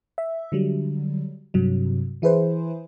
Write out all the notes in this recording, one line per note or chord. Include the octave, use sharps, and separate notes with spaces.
E5
D3 F#3 G3
G2 C3 F#3
E3 E4 G#4 B4 C5